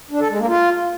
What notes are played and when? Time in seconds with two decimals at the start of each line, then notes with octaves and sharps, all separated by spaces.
0.11 D4
0.20 A4
0.29 G#3
0.39 A#3
0.48 F4